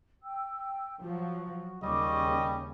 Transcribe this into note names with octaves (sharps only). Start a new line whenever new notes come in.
G5 E6
F3 F#3 F#4
D#2 C#3 G3 C#4 D#5 G5 C#6 D6